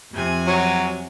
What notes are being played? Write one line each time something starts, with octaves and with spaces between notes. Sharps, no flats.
F2 C3 G#5
F#3